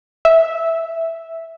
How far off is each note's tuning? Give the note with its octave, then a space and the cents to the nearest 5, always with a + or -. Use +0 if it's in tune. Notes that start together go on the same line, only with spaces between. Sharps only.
E5 -5